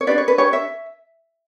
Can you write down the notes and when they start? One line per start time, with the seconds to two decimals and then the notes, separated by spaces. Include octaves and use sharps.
0.01 C#5
0.07 D4 G4 B4 D5
0.18 C#5
0.28 B4
0.38 D4 G4 B4 C#5
0.53 E5